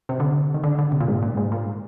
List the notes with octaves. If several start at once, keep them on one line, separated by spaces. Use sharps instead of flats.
C3
D3
D#3
D3
D3
C3
A#2
G#2
A#2
G2
G#2
A#2